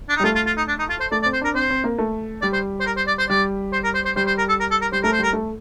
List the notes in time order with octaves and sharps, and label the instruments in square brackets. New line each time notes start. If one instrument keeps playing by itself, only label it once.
[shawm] D4
D#4
[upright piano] G3
[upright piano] A3 [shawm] F4
[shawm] F4
F4
D#4
D4
D#4
F4
C5
[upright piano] A3 [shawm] D5
[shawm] D5
[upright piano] C4
[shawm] C5
[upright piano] D4 [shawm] A#4
[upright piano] C4 [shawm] C5
[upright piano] C4
A#3
A3
[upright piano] G3 [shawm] D5
[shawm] C5
C5
A#4
C5
D5
C5
[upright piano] G3 [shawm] D5
[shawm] C5
A#4
C5
C5
[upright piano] G3 [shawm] C5
[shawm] C5
A#4
A4
A#4
A4
A#4
[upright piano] G3 [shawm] C5
[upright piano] A3 [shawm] A#4
[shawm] C5
[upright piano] G3 [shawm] A#4
[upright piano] A3